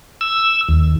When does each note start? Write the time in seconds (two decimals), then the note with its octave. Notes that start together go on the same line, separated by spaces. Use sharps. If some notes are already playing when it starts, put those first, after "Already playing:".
0.21 E6
0.69 D#2